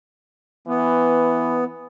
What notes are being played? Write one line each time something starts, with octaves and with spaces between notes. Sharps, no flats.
E3 B3